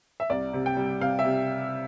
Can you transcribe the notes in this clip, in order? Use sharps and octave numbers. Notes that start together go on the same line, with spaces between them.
E5
C2 D5
C3
G5
G3
C3 F5
E5
C3